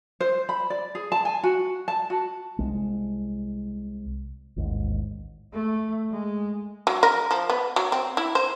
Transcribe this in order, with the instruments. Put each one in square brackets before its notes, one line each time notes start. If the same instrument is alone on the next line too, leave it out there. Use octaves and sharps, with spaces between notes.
[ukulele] C5
B5
D5
G#4
A5
G#5
F#4
A5
F#4
[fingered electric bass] C2 G#3
A1 D#2 G#2
[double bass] A3
G#3
[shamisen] F#3
A#4
F3
B3
F#3
C4
E4
C5